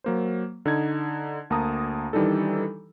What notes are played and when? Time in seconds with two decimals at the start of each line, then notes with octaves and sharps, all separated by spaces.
0.04 F#3 A#3 C5
0.66 D3 D#4 G#6
1.50 D2 A#3 A5 A#5 D#6
2.13 D#3 E3 G3 D4 D#4 A4